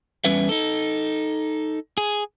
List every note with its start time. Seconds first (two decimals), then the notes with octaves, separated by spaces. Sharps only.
0.24 E2 G3 C#4 B4 E5
0.49 D#4 A4
1.97 G#4